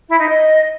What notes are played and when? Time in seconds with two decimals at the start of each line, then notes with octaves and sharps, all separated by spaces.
0.09 E4
0.19 D#4
0.28 D#5